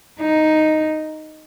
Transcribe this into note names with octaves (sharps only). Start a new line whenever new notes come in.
D#4